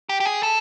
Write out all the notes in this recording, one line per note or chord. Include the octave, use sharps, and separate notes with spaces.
G4
G4
G#4
A4